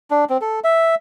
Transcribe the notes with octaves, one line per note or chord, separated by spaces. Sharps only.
D4
C4
A4
E5